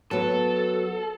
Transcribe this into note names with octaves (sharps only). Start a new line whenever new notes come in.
F#3 B3 A4